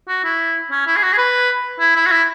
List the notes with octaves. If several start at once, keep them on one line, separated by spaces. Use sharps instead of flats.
F#4
E4
C#4
E4
G#4
F#4
G#4
B4
E4
E4
F#4
E4